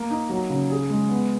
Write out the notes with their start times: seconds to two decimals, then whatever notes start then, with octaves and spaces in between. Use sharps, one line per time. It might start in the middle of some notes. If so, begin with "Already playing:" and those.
Already playing: A#3
0.10 D#4
0.30 F#3
0.50 C#3
0.70 G#4
0.90 G#3
1.09 B3